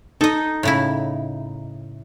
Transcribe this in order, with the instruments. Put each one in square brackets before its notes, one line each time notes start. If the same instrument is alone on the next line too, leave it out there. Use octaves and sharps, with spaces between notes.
[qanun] D#4 [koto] A4 D#5
[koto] A2 C#3 E4